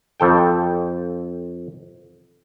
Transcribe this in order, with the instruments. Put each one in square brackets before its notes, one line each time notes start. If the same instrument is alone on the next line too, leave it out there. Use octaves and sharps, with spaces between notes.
[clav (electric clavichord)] F2 A4 G5